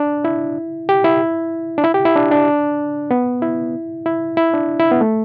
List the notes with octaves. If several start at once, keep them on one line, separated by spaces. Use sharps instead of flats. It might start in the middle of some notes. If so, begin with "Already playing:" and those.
Already playing: D4
E4
G4
E4
D4
E4
G4
E4
D4
D4
B3
E4
E4
E4
D4
E4
B3
A3